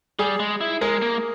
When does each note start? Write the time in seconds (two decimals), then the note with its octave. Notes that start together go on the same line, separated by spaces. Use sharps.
0.19 G3 G#4
0.40 G#3
0.61 E4
0.81 G#3 A#4
1.02 A#3